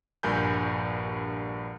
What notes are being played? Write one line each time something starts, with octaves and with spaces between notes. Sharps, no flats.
A#1 G2 A#4 G#5 B5 G6